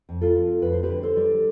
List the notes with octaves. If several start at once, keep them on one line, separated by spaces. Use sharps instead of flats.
F2
F4 A4
C4
F2 B4
C5
G4 B4
D3
A4 C5
G3